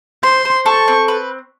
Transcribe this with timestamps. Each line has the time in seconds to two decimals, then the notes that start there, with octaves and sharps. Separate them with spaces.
0.23 C5 C6
0.45 C5
0.66 A4 C#6
0.88 C4
1.08 B4